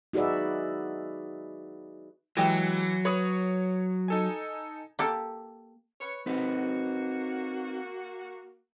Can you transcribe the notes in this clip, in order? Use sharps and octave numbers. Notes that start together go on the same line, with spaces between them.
D#4 F#4 G#4 B4 D5 E5
E3 F#3 G#3 G4
B4 C#5 C#6 D#6
D#4 A4 G#5
A#3 G4 A4
B4 C#5
A#3 C4 D#4 F#4 B4